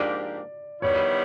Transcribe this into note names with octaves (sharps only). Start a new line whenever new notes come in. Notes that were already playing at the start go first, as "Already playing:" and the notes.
Already playing: G#2 F3 A#3 D4 G4 D5
D#3 G3 B3 E4 C#5